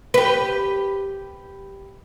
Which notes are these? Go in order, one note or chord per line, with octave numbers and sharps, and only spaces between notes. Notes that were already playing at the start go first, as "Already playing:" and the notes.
G4 B4